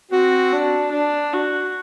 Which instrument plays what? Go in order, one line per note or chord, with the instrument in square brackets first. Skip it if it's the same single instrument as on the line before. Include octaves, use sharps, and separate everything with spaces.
[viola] C4 [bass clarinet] F#4
[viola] D4
D4
F#4